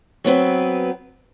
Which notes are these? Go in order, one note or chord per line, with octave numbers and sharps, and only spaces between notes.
F#3 B3 C4 B4